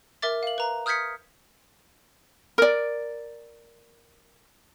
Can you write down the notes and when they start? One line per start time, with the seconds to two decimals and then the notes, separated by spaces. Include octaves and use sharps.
0.22 A#4 E5 D6 A6
0.43 F5 F#7
0.58 B4 A#5
0.86 D#6 F6 G6 G#6 B6 C#7
2.58 A#4 D5